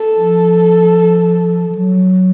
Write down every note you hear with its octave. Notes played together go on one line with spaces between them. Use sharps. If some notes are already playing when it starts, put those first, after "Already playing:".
Already playing: A4
F3
F3
F#3